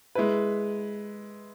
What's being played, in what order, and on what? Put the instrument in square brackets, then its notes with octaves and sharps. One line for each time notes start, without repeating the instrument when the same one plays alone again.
[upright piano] G#3 E4 B4